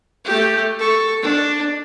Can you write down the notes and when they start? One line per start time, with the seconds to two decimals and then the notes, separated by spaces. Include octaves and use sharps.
0.25 A3 G4
0.79 A4 C#6
1.22 D4